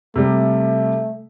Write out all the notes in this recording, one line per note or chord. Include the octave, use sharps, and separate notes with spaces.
C3 G3 A3